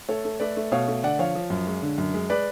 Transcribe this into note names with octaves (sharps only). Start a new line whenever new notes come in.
A3 A4 C#5
A3
A3 B4 D5
A3
B2 C#5 F5
A3
D3 D5 F#5
F3 C#5 F5
F3
F#2
G#3
D3
F#2
G#3
G#3 B4 D5